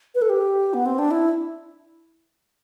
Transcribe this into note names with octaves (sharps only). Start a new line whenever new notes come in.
B4
A4
G4
B3
C4
D4
E4